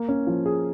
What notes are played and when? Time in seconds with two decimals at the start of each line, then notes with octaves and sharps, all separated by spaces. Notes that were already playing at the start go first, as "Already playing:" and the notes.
Already playing: A#3
0.08 C#4
0.27 F3
0.46 G#4